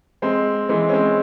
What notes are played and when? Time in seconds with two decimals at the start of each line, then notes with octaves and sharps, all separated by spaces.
0.22 G#3 C4
0.69 E3 G#3
0.89 C#4
0.93 G#3 C4